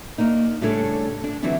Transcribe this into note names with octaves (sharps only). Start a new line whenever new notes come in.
A#3 D4 D#4
A2 C#3 G3 D4 A4 C#5
D4
D3 E3 F#3 C4 D4 E4